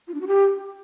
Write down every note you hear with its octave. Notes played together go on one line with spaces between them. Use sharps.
F4
D4
F#4
G4